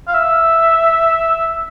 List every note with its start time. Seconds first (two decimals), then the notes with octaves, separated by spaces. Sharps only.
0.08 F5
0.15 E5